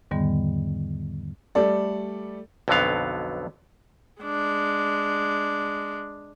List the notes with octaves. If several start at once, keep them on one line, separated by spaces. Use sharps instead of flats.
E2 G#2 D3 D#3 G3 B3
G3 A3 A4 D5
B1 F2 D3 F#3 B3 F5
G#3 D4